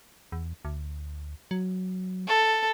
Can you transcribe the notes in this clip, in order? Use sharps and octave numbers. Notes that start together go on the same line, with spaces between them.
E2
D2
F#3
A4